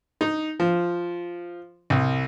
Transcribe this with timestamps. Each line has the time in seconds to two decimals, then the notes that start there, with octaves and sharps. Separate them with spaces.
0.21 D#4
0.60 F3
1.90 C2